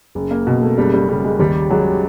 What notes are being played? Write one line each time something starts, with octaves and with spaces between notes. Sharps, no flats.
F#1
A#3
B2
A3
F#1 G3
G3
C#3 G3
G#3
D#2 G3
F#3 G#3